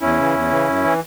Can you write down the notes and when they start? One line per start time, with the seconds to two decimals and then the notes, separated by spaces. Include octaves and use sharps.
0.01 E2 C#4 E4
0.18 C#3 E3
0.34 E2
0.50 C#3 E3
0.68 F#2
0.84 E3